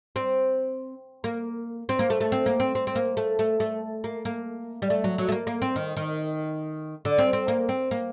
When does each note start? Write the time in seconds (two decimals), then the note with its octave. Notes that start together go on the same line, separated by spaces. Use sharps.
0.16 C4
1.24 A#3
1.89 C4
1.99 A#3
2.10 A3
2.20 A3
2.32 C4
2.46 A#3
2.60 C4
2.75 C4
2.87 C4
2.95 A#3
3.17 A3
3.39 A3
3.60 A3
4.04 A#3
4.25 A#3
4.82 G3
4.90 A3
5.04 F#3
5.18 F#3
5.29 A3
5.32 A#3
5.47 A#3
5.62 C4
5.76 D#3
5.97 D#3
7.05 D3
7.18 C4
7.33 C4
7.48 A#3
7.69 C4
7.91 A#3